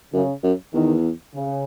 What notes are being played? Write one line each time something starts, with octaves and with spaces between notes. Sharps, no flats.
F#2 C#3
F#2
E2 D#3
C#3